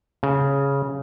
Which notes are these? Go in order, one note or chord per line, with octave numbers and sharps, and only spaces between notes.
C#3